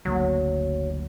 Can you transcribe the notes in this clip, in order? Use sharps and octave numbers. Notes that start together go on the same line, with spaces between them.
F#1 D2 F#3 A#3